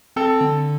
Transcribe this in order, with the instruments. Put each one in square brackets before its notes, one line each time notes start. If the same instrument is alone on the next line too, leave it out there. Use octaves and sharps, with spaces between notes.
[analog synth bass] C4 [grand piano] A4
[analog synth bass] D3